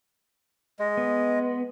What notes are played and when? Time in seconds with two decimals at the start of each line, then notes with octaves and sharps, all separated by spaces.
0.79 G#3
0.97 B3